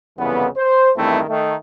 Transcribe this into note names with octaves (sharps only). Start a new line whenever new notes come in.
C2 F2 C#3 E3 B3
C5
E2 G2 D#3 A3 C4 E4
D#3 A3